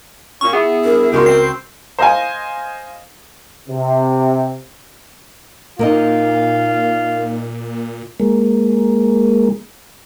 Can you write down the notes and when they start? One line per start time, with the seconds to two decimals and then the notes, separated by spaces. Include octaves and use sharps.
0.41 A#2 C#4 C#6
0.53 B3 E4 G#4
0.84 G2 A#4
1.12 C#2 G#3 D#4 F#4 G4 A#4 C6
1.26 C4 C7
1.99 C5 D#5 F5 G#5
3.68 C3
5.79 A#2 A#3 D#4 F4 D#5
8.20 G#3 A#3